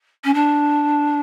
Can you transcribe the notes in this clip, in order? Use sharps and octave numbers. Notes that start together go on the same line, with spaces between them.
C#4
D4